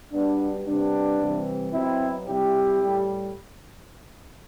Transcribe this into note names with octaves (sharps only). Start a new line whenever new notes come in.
B2 G3 B3 D4
C3 G3 B3 D4
C3 E3 G3
B2 F#3 C4 E4
C3 G3 E4 G4
A2 G3